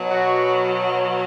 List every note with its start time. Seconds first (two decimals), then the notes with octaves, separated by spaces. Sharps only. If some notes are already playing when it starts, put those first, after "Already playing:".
Already playing: B2 F#3
0.09 F#4